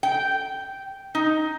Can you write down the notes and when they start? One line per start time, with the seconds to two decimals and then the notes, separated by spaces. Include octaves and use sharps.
0.03 G5
1.15 D#4